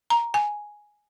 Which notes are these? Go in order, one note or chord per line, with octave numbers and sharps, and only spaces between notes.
A#5
G#5